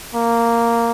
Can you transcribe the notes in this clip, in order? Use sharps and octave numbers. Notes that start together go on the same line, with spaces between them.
A#3